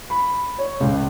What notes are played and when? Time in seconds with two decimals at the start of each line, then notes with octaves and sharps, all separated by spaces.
0.10 B5
0.58 C#5
0.80 C#2